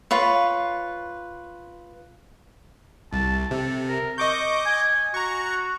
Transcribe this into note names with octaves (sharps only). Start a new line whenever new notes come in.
F4 B4 C#5
C2 A5
C3 A4
A#4
D#5 C#6 D6 G6
G#5
F#4 A#5 C#6